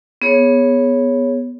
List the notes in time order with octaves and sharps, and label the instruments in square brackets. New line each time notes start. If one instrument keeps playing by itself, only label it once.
[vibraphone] B3 G#4 C#5